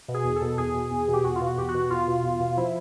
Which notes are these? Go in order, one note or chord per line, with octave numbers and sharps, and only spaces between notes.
B2
G#4
E2
A4
B2
E2 G#4
B2
E2
B2
G4
E2 F#4
F4
B2
F#4
E2 G4
F#4
B2
E2 F4
B2
E2
B2
F3 E4